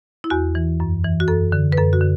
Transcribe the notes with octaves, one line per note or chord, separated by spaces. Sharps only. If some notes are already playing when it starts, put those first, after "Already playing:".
E4
E2 F#4
E3
F#2
E3
F#4
F#2 A4
D3
B4
F#2 A4
F#4
D3